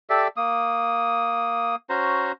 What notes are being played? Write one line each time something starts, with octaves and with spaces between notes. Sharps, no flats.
G4 A4 D5 E5
A#3 D#6
C#4 F#4 C5 A#5